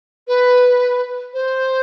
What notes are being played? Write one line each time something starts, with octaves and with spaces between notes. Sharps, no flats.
B4
C5